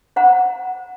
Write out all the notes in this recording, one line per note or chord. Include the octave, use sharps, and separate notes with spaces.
C5 F#5 A#5